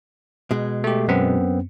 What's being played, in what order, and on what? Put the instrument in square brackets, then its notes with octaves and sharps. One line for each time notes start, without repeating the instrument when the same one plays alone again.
[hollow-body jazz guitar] B2 G#3
[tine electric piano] A3 G4
F#2 B3 C4